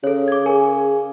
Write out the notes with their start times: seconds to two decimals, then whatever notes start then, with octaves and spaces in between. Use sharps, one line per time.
0.04 C#3 A4 C#5
0.28 D6 G#6
0.46 G#4 A#4 G#5